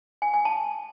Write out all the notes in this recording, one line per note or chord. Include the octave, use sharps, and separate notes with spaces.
G#5
G#5
A5